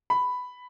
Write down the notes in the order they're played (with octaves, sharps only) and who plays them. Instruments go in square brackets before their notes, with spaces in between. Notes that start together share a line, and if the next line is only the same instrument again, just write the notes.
[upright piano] B5